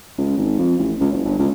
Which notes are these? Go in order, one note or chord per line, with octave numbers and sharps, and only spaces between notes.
C#2
G#1
F2
A1
C#2
F#1
G1
C#2